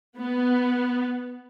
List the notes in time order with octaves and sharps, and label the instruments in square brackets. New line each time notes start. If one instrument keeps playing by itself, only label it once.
[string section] B3